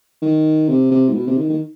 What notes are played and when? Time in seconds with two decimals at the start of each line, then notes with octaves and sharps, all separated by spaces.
0.22 D#3
0.69 C3
0.91 C3
1.09 G#2
1.15 B2
1.27 C3
1.38 D#3
1.49 D#3